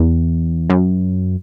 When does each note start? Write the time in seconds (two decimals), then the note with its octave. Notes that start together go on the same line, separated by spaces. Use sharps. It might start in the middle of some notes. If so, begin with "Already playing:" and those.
Already playing: E2
0.70 F#2